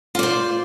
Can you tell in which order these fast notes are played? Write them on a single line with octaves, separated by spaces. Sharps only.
F4 D5 C5